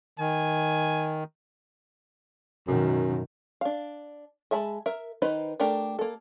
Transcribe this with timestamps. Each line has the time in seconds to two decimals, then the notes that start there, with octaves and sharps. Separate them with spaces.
0.19 D#3 G#5
2.68 F#2 B2 D#3
3.61 D4 F5
4.51 G#3 E5 A5 B5
4.86 A#4 E5
5.22 D#3 D#4 B4 C5 B5
5.60 A3 D4 G4 A#4
5.99 A#3 A4